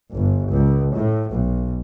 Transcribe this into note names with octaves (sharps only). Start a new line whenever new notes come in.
G1
C#2
A2
B1